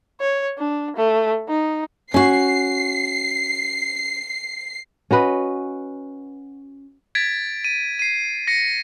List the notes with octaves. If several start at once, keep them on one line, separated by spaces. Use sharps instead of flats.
C#5
D4
A3
D#4
C#4 F#4 C7
C#4 F#4 B4 D#5
G#6 A6 B6 D7
D#7
C7 D#7
A#6 C#7